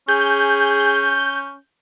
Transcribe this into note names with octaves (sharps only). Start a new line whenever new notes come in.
C#4 G#4 G6